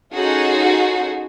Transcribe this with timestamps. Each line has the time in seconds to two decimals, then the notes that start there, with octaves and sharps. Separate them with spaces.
0.13 C#4 D#4 F4 F#4 G#4 A4